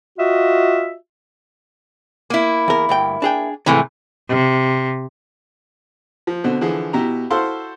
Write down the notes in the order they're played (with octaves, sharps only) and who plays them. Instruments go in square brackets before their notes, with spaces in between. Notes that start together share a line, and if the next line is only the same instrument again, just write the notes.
[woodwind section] F4 F#4 D#5 E5
[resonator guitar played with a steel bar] A#3 E4
[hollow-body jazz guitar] E2 A#4
D2 G2 G5
D4 G#4 G5
[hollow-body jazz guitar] G#2 D#3 [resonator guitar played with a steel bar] C3 E3 A3
[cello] C3
[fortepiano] F3
B2 D3 C4
D3 E3 F3 G#4
B2 E4 G4 A#5
E4 F#4 A4 C5 F5 C6